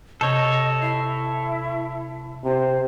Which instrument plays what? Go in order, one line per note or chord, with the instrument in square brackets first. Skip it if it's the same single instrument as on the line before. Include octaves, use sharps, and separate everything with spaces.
[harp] C3 F6 G6 [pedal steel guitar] A4 C#5 [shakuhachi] D#5
[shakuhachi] E4 [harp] C7
[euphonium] C3 [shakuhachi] C5